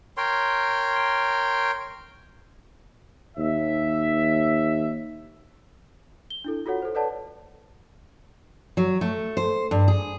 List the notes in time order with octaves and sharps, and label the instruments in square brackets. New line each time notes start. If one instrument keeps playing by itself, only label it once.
[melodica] A#4 C#5 G5 C6
[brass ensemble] D#2 E5
[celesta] G7
D4 E4 A4
F4 F#4 A4 C#5 F#5
A4 C5
A4 B4 C#5 D5 F#5 A5
[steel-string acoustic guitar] F#3
A3
C5
G2
G#4